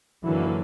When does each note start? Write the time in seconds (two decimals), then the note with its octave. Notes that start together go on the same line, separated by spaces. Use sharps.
0.23 F#2 D3 E3 F#3 A#3